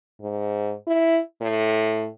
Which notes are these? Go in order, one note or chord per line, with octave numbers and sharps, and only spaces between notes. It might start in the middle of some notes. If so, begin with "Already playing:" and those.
G#2
E4
A2